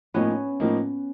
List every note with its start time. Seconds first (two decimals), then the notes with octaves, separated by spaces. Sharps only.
0.14 A2 F3 A#3 B3 C#4 D#4
0.60 A2 F3 A#3 D#4